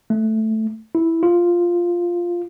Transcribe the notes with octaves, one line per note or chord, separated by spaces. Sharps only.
A3
E4
F4